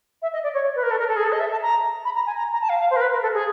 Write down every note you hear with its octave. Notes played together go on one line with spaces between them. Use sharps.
E5
D#5
D5
C#5
B4
A#4
A4
A#4
A4
G#4
A4
D#5
E5
A5
A#5
B5
A#5
G#5
A#5
A#5
A5
F5
F5
C5
A#4
B4
A#4
A4
G#4